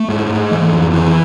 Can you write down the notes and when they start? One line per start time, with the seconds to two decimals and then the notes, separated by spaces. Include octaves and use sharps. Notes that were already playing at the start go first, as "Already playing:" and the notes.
Already playing: A3
0.08 G#2
0.29 G#2
0.51 E3
0.73 F2
0.94 E3